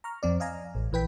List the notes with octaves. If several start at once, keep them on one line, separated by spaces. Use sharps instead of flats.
A#5 C#6 F6
F2 C4 D5
D#5 F5 G#5 A#5
A1
A#1 E3 B4 G5 B6